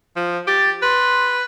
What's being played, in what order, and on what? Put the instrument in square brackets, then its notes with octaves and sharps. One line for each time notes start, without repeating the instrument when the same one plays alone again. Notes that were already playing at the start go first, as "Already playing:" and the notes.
[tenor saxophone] F3
[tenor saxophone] G4 [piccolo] A6
[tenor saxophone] B4 [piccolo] C6